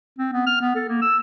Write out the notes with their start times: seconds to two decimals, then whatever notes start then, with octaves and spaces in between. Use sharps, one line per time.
0.19 C4
0.33 B3
0.46 F6
0.61 B3
0.75 A4
0.88 A#3
1.02 E6